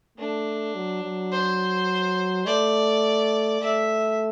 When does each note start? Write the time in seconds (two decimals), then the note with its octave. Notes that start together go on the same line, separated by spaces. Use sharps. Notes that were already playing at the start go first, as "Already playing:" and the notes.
0.18 A3 D4
0.75 F#3
1.04 F#3
1.32 C5
2.47 A3 D5
3.61 A3 E5